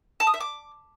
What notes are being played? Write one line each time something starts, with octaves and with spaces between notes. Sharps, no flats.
A5
D#6
E5
D6